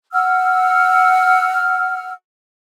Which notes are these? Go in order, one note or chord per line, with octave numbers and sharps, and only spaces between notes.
F#5 E6 F6